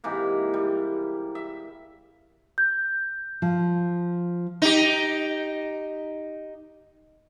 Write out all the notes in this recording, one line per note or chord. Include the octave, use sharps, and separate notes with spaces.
G#2 C3 E3 A#3
G3
E5
G6
F3
D#4 G4